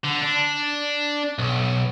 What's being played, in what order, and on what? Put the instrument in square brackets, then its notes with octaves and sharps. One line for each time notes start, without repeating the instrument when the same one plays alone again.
[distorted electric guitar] D3
D4
B1